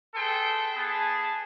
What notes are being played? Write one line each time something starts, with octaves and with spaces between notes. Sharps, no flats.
G#4 A4 B4 G5 C6
B3 G#4 A5